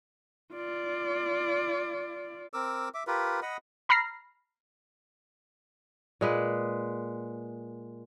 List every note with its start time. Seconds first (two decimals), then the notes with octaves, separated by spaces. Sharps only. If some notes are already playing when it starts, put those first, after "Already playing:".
0.54 F4 D5
2.53 C4 A#4 D6 E6
2.94 E5 D6
3.07 F4 G4 A#4 B4
3.42 D#5 F#5 B5 D#6
3.89 A#5 B5 F6 A#6 C7
6.21 A#2 G#3 B4